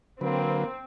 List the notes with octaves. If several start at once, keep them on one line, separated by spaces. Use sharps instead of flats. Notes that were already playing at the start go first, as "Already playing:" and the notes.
D3 F#3 A#3 C4 B4